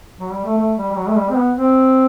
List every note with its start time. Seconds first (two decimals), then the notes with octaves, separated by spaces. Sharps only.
0.20 F#3
0.32 G3
0.45 A3
0.58 A3
0.78 G3
0.92 G3
0.97 F#3
1.09 A3
1.17 G3
1.30 C4
1.36 B3
1.56 C4